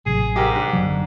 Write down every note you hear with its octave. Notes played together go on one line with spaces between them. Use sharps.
A1 C3 F#3 G#4
G#2 G4 A#4
D4
F#1 D3 F#3